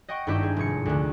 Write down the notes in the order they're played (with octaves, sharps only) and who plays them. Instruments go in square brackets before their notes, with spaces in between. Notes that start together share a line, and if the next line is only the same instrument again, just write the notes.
[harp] D#5 F#5 G5 C#6
G#1 G2 D#4 E4 G4 G6
G#4
F1 G#2 G#4 C#7
D2 D3